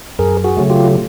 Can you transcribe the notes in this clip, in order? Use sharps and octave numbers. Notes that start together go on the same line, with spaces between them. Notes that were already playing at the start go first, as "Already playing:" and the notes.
F#2 G#4 A#4
F#4 G#4
C#3 F#3 A3
F4 G4